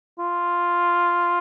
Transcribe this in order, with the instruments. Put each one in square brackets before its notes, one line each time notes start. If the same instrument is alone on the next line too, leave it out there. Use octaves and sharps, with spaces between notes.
[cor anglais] F4